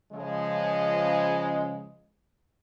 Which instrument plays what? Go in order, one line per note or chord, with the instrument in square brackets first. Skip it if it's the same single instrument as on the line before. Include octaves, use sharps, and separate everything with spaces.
[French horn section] C#3 F3 G#3